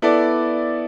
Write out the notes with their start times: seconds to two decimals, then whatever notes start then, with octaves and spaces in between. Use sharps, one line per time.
0.02 B3 E4 A4 D5